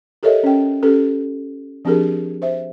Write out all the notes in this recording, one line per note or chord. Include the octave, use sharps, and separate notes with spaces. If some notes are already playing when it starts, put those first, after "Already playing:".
G4 A4 A#4 C#5 D#5 E5
C#4 G5
C#4 G4 A4 B4
F3 C4 D4 G4 G#4 A#4
C5 E5